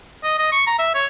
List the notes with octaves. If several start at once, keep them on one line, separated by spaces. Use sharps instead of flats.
D#5
D#5
C#6
A#5
E5
C#5